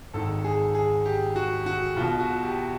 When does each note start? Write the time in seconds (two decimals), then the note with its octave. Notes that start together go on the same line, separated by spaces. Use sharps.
0.13 G#1 G#2 D#3 A4
0.44 G#4
0.75 G#4
1.06 G4
1.36 F#4
1.66 F#4
1.97 B1 F4
2.01 B2
2.20 F#4
2.43 G4